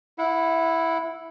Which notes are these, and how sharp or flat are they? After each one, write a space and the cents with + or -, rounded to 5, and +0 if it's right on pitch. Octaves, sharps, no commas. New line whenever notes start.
E4 +0 F#5 -30